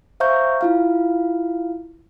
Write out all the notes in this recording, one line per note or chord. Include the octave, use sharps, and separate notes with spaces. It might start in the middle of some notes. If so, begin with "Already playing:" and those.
C5 E5 F5 A#5 C#6 G6
E4 F4 F5